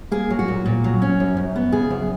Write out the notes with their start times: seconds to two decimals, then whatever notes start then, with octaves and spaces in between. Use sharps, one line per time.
0.11 A#3 G#4
0.30 F#3
0.39 F#4
0.48 A#2
0.66 A#2
0.84 F#3
1.02 C#4
1.20 F#2
1.37 F#2
1.56 B3
1.72 C#3 G#4
1.91 F#2